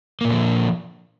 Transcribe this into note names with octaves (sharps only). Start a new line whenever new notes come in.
A#2 D3 F3 A#3